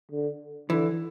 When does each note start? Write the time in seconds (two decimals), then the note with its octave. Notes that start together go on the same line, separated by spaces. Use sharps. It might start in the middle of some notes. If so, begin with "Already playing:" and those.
0.12 D3
0.70 D3 E3